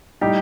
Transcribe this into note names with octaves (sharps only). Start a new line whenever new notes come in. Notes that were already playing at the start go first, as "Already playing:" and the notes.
A2 G3 D#4 G4